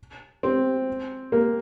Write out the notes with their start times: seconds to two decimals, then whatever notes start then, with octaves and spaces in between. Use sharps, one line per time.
0.43 C4
1.32 A#3